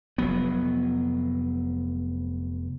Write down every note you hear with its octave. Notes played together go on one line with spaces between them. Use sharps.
F1 F#3 B3